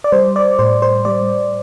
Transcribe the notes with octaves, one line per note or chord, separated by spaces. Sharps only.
D5
G3 C5
D5
A2 C5
C5
G3 D5